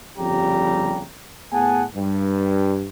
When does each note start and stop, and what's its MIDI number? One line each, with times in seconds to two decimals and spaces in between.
0.18 1.02 31
0.18 1.02 41
0.18 1.02 49
0.18 1.02 55
0.18 1.02 67
0.18 1.02 82
1.52 1.83 45
1.52 1.83 59
1.52 1.83 68
1.52 1.83 78
1.52 1.83 80
1.52 1.83 81
1.95 2.88 43